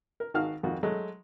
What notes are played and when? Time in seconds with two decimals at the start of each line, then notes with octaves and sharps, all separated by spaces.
0.20 A#4
0.34 G#1 D#3 F#4 F5 F#5 F6
0.63 G#1 F2 D#3 F4 F#4
0.83 F#3 G#3 A3